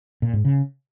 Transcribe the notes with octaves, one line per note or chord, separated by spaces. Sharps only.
A#2
G#2
C#3